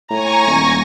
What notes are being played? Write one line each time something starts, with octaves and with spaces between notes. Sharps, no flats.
A2 G#5 A#5 C#6 A#6
D#1